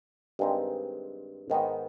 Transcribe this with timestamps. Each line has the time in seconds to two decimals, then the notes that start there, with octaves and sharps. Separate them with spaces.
0.39 G2 D#3 G#3 C4 D#4
1.50 G#2 D#3 B3 D#4